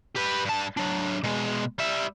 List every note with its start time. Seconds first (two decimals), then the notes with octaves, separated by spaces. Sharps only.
0.15 G4 B4
0.45 G2 A5
0.77 F#3 D4
1.24 B2 G#3
1.79 G3 E5